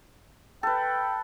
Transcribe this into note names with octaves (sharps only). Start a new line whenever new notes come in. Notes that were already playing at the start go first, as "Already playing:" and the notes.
A4 B4 G5